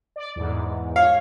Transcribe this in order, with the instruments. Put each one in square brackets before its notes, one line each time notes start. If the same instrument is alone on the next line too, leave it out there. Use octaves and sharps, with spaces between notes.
[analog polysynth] D5
E2 G#2
[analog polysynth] C#5 [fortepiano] F5